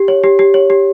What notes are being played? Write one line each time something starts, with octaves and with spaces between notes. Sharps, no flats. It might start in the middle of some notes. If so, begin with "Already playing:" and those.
Already playing: G4
C#5
G4
G4
C#5
G4